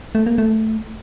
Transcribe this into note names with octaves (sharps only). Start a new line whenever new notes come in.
A3
A#3
A3